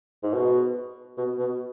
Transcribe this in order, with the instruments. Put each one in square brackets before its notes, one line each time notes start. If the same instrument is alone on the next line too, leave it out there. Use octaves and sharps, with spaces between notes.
[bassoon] G#2
B2
B2
B2